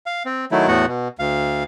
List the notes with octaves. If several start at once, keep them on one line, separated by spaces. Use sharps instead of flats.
F5
C4
D#3 F#3 A3 E4
E2 A2 A3 B3 F#4 F#5
B2
D2 F5